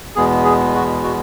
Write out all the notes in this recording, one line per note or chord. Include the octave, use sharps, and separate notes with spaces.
E2 B2 G#3 B3 G#4
G#4
F#4
F#4